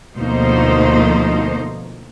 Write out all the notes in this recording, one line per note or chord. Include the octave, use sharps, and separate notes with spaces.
D2 B2 F3 A#3 D#4 C5